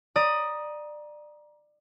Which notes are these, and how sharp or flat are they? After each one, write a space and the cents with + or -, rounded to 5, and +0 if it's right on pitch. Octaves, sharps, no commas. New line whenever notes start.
D5 +25 A#5 +25 D#6 +0